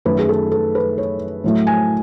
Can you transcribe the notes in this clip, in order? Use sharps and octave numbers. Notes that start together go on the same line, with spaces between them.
F#2 D#3 A3 B4
G#4
A4
A4
B4
C#5
A2 F#3 A3
G#5